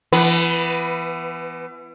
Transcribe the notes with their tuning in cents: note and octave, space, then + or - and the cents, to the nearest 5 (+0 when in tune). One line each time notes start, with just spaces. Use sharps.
E3 +35 B3 +20 B4 +0